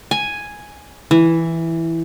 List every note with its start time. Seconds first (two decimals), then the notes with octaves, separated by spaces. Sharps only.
0.11 G#5
1.11 E3